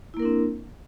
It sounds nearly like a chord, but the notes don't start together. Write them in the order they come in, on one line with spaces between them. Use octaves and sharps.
E4 A#3 A#4 D4 C4